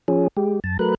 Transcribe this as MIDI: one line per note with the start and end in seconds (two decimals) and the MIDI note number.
0.08 0.28 53
0.08 0.28 61
0.08 0.28 68
0.37 0.60 56
0.37 0.60 67
0.64 0.77 42
0.64 0.77 81
0.79 0.95 54
0.79 0.95 57
0.79 0.95 70
0.79 0.95 71
0.79 0.95 90